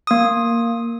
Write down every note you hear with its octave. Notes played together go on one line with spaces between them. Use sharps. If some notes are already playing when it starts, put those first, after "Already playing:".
A#3 D#6